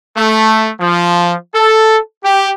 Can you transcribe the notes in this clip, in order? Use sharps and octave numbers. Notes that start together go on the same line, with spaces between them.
A3
F3
A4
G4